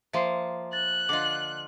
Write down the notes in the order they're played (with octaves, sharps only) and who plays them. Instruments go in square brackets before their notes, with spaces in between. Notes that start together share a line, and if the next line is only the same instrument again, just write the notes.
[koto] F3 A#3 [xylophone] E5 C6 C7
[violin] F#6 [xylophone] A6
[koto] D3 F4 [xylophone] D#5 D6